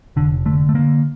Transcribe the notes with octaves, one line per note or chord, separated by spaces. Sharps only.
F1 D3
D3 A3
A3
D3 A#3